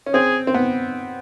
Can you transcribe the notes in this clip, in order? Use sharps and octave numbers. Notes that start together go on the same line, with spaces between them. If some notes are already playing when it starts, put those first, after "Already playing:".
C#4
C4 G#4
C4
B3